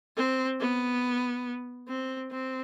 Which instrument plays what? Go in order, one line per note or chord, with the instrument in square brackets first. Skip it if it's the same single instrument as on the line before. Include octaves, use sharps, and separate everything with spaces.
[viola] C4
B3
C4
C4